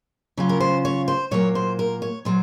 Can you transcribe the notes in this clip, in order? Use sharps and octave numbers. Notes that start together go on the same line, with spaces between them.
C#3 F#3 C#4 F4
A#4
C5
C#5
C5
A#2 F#3 A#3 C#5
C5
A#4
C#5
A#2 F#3 C5